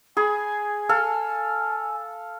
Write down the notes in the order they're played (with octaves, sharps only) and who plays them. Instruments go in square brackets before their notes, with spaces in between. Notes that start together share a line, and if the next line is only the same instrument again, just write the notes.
[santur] G#4 B5 [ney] G#5
[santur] A4 F5